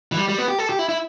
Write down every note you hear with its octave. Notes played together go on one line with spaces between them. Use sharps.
E3
G3
G3
B3
G4
A4
G4
E4
E4